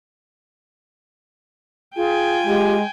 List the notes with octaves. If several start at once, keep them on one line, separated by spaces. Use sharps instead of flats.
F4 G#4 G5 G#5
G#3 G4